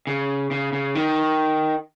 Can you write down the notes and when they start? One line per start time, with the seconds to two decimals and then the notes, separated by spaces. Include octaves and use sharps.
0.07 C#3
0.51 C#3
0.73 C#3
0.95 D#3